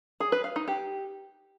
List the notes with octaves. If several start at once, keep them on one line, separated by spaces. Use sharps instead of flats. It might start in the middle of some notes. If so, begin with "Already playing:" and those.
G#4
B4
F5
D#4
G4